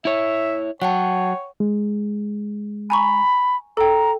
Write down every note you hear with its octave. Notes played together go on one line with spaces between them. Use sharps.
E4 C#5 E5
F#3 C#5 F#5 G5 A5
G#3
G#5 A#5 B5 C#6
A4 G5 A#5